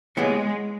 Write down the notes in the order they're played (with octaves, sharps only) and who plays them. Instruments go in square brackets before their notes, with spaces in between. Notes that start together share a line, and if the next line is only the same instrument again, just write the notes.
[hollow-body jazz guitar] D#2 C#3 E3 B3 [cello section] G#3